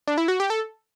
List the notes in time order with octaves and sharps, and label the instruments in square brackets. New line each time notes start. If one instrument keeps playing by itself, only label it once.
[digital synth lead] D4
E4
F#4
G4
A4